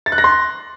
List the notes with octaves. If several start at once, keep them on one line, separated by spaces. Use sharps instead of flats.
A6
F#6
A#6
C6